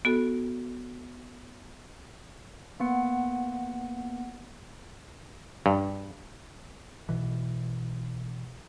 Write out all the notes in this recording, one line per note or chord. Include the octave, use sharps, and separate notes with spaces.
B3 F#4 A4
A#3 B3 F#5
G2
B1 B2 E3